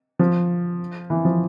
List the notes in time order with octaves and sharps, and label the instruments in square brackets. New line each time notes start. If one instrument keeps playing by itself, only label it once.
[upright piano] F3
E3
F3